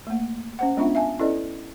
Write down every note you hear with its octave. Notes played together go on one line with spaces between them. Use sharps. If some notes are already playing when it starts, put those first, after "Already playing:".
A3 A#3
C#4 C5 F#5
G#3 B3 C#4 D4 F4 E5
E5 F5 G#5 A5
C#4 E4 A4 B4 D5 D#5